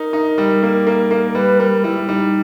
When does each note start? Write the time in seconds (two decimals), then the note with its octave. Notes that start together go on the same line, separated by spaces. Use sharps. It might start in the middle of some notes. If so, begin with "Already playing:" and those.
Already playing: D#4 A#4
0.13 D#4
0.38 G3
0.63 A#3
0.87 A#3
1.11 A#3
1.27 A#4
1.35 G3 B4
1.59 G3 A#4
1.84 G3 E4
2.08 G3 D#4